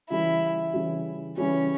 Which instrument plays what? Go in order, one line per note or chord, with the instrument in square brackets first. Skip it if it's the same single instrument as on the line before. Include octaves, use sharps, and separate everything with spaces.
[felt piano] C#3 E3 G3 [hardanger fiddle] E4
[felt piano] C#3 E3 G3
[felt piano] C#3 E3 G3 [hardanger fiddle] C#4